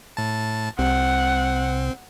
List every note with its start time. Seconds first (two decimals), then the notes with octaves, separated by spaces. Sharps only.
0.17 A2 A5
0.79 C2 C4 F#5